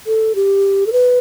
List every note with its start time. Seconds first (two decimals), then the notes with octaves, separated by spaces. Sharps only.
0.07 A4
0.35 G4
0.87 A4
0.93 B4